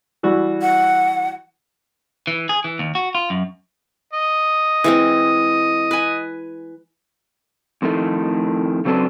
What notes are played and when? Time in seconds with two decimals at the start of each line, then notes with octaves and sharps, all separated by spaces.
0.23 E3 G3 F#4
0.62 F#5
2.27 E3
2.49 G#4
2.64 E3
2.79 D#2
2.95 F#4
3.15 F4
3.30 F#2
4.13 D#5
4.84 E3 G#3 C4
5.91 B4 G#5
7.82 F2 A2 D#3 A3
8.85 C#3 F#3 C4 D4 A4 B4